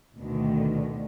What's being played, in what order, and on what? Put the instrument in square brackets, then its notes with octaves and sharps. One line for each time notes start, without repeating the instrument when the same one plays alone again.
[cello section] D2 B2 D3 D#3